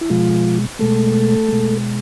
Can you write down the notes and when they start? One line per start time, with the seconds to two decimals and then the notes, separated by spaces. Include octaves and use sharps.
0.01 E4
0.10 B2 F3 G#3 F4
0.79 B2 G#3 A3 A4
1.49 B2 G#3